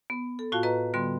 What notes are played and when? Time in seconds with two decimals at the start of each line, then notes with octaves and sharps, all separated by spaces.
0.10 B3
0.39 A4
0.52 A2 F4 F#4 F5 A5
0.63 B4 D#5 A#5
0.94 D3 G3 B3 C6